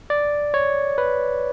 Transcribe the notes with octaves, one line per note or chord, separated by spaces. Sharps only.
D5
C#5
B4